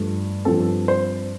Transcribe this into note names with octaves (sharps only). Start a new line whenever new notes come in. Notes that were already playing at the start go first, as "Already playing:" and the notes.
Already playing: G2 F3 A3
G2 F3 C4 A4
C5